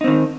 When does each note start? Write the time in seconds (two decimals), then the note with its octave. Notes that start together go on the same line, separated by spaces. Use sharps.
0.01 D#4
0.04 C4
0.08 D#3